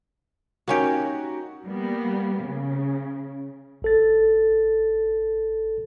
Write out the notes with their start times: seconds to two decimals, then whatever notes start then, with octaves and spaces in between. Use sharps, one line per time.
0.68 A#3 C#4 D#4 F#4 G4
1.65 G3 A#3 B3
2.44 C#3
3.82 A1 A4 A6